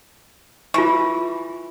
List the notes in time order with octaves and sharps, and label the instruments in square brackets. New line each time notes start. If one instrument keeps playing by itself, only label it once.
[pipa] E3 [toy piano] F4 C#6